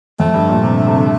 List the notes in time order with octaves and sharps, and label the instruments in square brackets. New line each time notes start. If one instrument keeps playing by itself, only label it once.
[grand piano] F2 [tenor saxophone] A3
[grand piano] G2
A#2
C3
D3
C3
D3